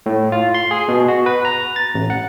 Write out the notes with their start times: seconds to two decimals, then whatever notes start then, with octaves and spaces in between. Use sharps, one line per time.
0.06 A2
0.32 F4
0.54 C6
0.71 G#4
0.88 B2
1.08 F#4
1.26 B4
1.45 A#5
1.76 A6
1.94 A1
2.10 F#5